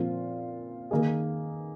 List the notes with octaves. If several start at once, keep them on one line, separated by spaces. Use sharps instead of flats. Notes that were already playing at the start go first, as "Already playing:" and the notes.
Already playing: A#2 F3 C4 F4 A#4
D#3 A#3 D#4 G#4